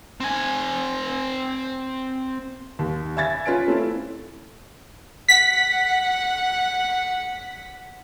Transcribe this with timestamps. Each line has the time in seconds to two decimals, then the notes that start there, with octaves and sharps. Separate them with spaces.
0.20 C4 G#5
2.79 D#2
3.17 E5 G#5 G#6 A6
3.46 C#4 F4 B4 G#5 D7
3.68 A3 C4 C#4 E4
5.29 F#5 B6